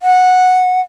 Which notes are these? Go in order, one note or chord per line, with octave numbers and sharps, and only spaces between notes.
F#5